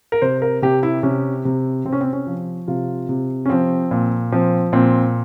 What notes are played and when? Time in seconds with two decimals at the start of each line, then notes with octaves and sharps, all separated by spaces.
0.12 A#4
0.22 C3 C5
0.42 A#4
0.62 C3 G4
0.83 E4
1.03 C3 C#4
1.45 C3
1.85 C3 C4
1.93 C#4
2.01 C4
2.13 C#4
2.27 F3
2.68 C3 F4
3.09 C3
3.46 C#4
3.50 F3 C4
3.91 A#2
4.32 F3 C4
4.73 A#2 C4